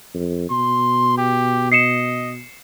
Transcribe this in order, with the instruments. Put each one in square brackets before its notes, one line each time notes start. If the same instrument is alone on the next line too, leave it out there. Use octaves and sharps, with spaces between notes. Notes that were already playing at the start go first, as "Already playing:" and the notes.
[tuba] F2
[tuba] B2 [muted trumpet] C6
[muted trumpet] G4
[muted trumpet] D#5 [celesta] C7 C#7 E7